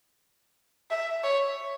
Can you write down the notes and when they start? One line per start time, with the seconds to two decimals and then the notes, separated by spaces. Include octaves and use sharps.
0.91 E5
1.24 C#5